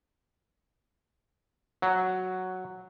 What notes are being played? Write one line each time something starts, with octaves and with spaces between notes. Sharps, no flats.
F#3